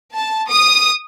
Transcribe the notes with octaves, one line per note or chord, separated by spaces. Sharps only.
A5
D#6